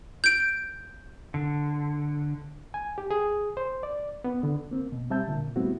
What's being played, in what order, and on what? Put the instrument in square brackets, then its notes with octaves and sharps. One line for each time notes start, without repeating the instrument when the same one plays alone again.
[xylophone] G6 D7
[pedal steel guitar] D3
[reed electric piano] G#5
G4
G#4
C5
D5
B3
D3
A#3 C4
B2
G3 C4 E5 A5 G6
A#2 D3
G3 A3 B3 C4 E4 F#4